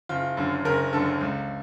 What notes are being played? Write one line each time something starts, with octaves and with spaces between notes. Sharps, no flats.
F#1 F4
F#2 D3
F#1 A#4
F#2 D3 A4
C#2